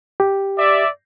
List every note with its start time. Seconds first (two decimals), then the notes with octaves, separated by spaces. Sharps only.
0.20 G4
0.58 D5 E5